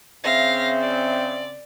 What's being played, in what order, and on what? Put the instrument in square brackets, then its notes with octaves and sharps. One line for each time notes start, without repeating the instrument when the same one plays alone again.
[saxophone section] C#3 C4 [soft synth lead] E5 [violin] F5 A#6
[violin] D5